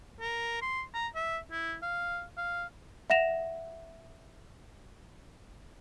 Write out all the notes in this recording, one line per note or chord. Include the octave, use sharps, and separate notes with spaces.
A#4
C6
A#5
E5
E4
F5
F5
E5 F#5 A#6 E7 F7